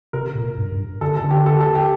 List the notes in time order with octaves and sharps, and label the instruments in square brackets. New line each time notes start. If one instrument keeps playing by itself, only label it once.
[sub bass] C3 [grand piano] A#4
[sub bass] A#2
G2
G2
[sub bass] D3 [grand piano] A4
[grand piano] A4
[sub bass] D3
[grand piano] G4
A4
A4
G4